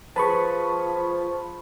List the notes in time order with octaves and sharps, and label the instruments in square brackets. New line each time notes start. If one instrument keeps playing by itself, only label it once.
[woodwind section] F3 [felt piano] G#4 B4 [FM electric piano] A5 B5 C#6